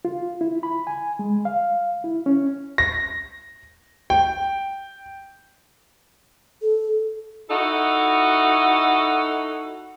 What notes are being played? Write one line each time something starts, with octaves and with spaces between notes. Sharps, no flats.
F4
E4
B5
G#5
G#3
F5
E4
C#4
A#6
G5
A4
D#4 E4 F#4 A4 D#5